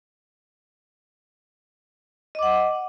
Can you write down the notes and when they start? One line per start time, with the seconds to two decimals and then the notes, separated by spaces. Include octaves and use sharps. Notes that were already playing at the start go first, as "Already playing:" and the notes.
2.35 D#5
2.39 D6
2.43 F#5